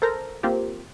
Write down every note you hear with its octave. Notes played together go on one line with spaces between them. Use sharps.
A4 A#4 C5 A#5
A#3 C4 F4 G4